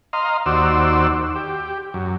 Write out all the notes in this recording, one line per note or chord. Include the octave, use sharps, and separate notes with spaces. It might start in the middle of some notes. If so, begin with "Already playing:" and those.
D#5 F5 A#5 C6
D#2 F#4 C5 D5 E6
G4
F#2